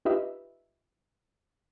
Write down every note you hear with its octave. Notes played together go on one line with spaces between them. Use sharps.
D#4 F4 G4 B4 D#5 E5